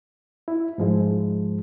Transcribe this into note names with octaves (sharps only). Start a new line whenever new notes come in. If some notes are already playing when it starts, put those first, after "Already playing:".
E4
G#2 F3 G#3